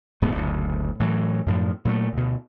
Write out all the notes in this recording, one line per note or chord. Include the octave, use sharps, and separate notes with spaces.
D1 G#2 A3 B3
F#1 D2
A2 E3 F#3
F#2 A2 F3
A#2 F#3 G#3 A3
D2 B2